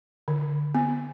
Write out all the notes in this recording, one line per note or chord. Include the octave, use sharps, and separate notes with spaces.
D3
B3